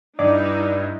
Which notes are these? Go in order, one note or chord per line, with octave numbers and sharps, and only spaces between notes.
G2 G3 D#4 E4 D5